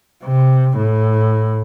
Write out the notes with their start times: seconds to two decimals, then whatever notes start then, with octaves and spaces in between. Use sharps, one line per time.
0.25 C3
0.78 A2